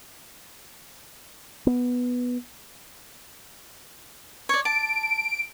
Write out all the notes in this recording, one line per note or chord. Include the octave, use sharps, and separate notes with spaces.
B3
C#5 D5
A5 D7